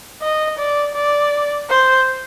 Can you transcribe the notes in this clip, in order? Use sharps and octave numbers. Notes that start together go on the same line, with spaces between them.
D#5
D5
D5
C5